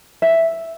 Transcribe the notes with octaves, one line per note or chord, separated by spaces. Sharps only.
E5